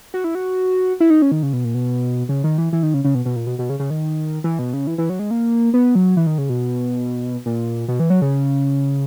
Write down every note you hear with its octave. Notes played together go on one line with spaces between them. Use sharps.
F#4
E4
F#4
E4
D#4
C#4
D#3
C#3
B2
A#2
B2
C#3
D#3
E3
E3
D#3
C#3
C#3
B2
B2
A#2
B2
B2
C#3
C#3
D#3
E3
B2
C#3
E3
E3
F#3
G#3
A#3
B3
F#3
E3
D#3
C#3
B2
A#2
B2
E3
F#3
C#3